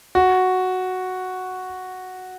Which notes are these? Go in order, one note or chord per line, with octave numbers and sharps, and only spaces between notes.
F#4